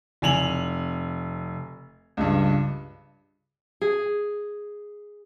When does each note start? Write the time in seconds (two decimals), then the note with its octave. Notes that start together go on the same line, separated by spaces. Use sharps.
0.22 F1 G#5 F7 F#7
2.17 C#2 G2
3.81 G#4